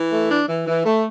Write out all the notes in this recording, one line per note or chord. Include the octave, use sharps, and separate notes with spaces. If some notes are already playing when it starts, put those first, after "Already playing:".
Already playing: E3
A3
D4
E3
E3
A3